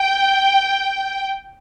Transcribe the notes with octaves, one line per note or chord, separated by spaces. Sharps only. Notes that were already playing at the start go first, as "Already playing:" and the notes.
Already playing: G5